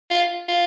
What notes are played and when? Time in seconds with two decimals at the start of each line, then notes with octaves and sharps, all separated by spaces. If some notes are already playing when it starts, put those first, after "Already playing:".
0.11 F4
0.48 F4